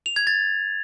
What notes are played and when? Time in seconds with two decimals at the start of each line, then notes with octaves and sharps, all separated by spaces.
0.06 F7
0.16 G#6
0.27 A6